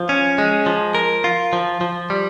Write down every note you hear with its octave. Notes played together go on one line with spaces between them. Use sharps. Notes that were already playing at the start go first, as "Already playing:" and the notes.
Already playing: F3
C#4
G#3
F3
A#4
F4
F3
F3
G3